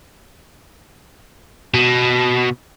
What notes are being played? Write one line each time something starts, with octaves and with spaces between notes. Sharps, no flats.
B2